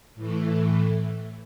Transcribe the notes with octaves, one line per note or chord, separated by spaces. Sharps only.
A2 E3 A3